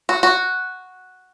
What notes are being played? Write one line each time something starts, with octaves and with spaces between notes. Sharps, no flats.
F#4
F#4